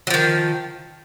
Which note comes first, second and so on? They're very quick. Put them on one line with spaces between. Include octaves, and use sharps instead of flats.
F#3 F3 D#3